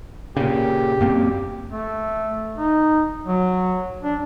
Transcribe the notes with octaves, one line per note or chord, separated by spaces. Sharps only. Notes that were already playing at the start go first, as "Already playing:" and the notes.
A#2 C#3 G4
F#2 A#3 C4
A3
D#4
F#3
D4